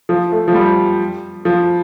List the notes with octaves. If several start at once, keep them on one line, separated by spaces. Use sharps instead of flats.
F3
A3
F3
G3
F3